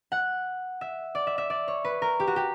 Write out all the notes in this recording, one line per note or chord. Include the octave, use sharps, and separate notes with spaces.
F#5
E5
D5
E5
E5
D5
C#5
B4
A#4
G4
F#4
G4